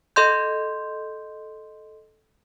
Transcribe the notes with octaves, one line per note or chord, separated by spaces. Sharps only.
A4 D#5 C6 G6